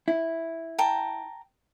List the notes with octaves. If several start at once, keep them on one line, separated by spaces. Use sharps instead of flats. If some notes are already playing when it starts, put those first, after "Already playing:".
E4
G5 A5 A#5